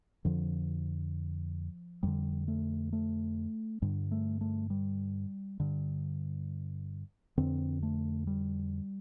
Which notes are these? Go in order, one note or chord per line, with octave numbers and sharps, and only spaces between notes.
F2 D3 F3
F2 D3 G3
A3
A3
G2 D3 G3
A3
A3
G3
G2 D3
F2 D3 C4
A3
G3